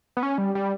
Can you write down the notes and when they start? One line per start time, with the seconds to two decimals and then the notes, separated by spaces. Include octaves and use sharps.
0.17 B3
0.23 C#4
0.38 G3
0.55 G3